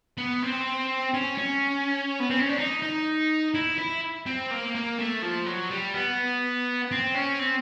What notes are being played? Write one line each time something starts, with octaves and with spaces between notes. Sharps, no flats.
B3
C4
C#4
C#4
B3
C4
C#4
D4
D#4
D#4
E4
E4
C4
A#3
A#3
A3
F3
F#3
G3
B3
C4
C#4
C4